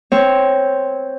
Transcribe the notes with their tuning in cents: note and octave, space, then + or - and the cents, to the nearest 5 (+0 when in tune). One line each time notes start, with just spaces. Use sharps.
C4 +0 C#5 -5